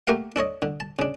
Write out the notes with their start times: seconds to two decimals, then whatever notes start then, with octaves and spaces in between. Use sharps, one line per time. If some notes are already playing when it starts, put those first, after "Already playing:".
0.07 A3 A#3 G4 A#4 F5 F#5
0.36 D4 A4 C#5 D#5
0.62 D3
0.80 A5
0.99 C#3 D4